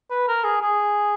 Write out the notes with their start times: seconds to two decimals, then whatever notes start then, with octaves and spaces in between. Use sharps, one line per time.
0.10 B4
0.28 A#4
0.44 G#4
0.61 G#4